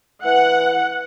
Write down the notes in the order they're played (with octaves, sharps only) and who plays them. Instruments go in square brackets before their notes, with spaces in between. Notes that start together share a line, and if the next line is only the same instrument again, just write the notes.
[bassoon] E3 [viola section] F#5